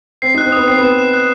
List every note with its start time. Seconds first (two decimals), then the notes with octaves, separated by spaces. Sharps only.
0.22 C4 C7
0.34 D#4 F#6
0.46 C4
0.52 B3 D#6
0.68 C4 C7
0.78 B3
0.83 E7
0.99 E7
1.14 F#6